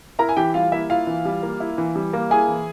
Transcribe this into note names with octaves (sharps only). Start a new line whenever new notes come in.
E4 A#4 A#5
G#5
E3 G4 G5
G3 F4 F5
A#3 E4 E5
E4 F4 F5
E3
G3
A#3
E4
E3
G3
A#3
E4 G#4 G#5
E3